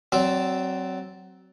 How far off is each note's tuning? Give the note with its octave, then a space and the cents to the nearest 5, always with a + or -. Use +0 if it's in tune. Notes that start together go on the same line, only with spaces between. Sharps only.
F#3 +20 C4 +0 D5 -5